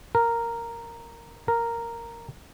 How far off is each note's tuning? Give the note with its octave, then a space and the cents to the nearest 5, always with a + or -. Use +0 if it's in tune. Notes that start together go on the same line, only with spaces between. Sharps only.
A#4 -5
A#4 -5